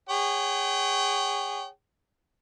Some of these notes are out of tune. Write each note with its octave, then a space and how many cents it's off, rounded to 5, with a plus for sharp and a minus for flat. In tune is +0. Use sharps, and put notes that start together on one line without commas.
G#4 -35 C#5 +0 G5 -45